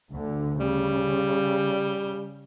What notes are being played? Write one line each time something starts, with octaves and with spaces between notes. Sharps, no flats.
D2 D3
C#3 G3